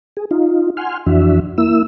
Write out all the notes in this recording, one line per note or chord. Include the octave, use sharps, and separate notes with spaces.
G#4
D#4 F4
F#5 G#5 C6 F6
F2 E3 D4 F#4 E5
A#3 E4 E6